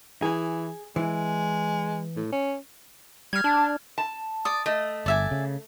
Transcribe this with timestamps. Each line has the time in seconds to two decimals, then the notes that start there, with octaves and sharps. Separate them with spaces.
0.22 E3 G#4
0.96 E3 G#3
2.16 A2
2.32 C#4
3.33 G3 F6 G#6
3.44 D4 A5
3.98 A5
4.45 D5 D#6
4.66 A3 D#5
5.06 G1 D5 E5 G#5
5.31 C#3